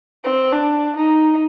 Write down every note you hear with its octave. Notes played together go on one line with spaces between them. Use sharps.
C4
D4
D#4